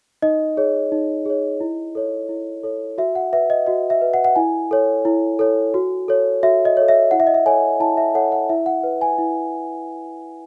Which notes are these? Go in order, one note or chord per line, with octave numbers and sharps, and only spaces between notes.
D#4 D#5
G#4 C#5
D#4
G#4 C#5
E4
A4 C#5
E4
A4 C#5
F#4 E5
F#5
B4 E5
D#5
F#4 D#5
E5
B4
F#5
F#5
E4 G#5
A4 C#5
E4
A4 C#5
F#4
A4 C#5
F#4 E5
D#5
A4 C#5
E5
E4 F#5
E5
D#5
E5
A4 C#5 G#5
E4 A5
E5
A4 C#5 F#5
F#5
E4 E5
F#5
B4
G#5
E4